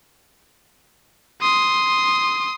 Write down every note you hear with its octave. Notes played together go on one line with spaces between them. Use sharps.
C6 D#6